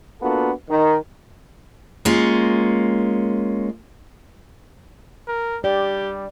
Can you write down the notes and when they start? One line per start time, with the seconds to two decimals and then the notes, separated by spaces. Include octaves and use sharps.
0.22 A#3 B3 D4 F4 F#4 A4
0.70 D#3
2.05 G#3 A#3 C#4 F4
5.28 A#4
5.64 G3 G4 D5